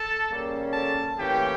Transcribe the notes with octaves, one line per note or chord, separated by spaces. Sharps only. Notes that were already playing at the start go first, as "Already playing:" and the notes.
Already playing: A4 A5
C#3 G3 A#3 C#4
A4 A5
A2 E3 A#3 C#4 G4 G5